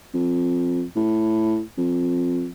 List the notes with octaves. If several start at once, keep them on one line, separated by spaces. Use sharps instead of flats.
F2
A2
F2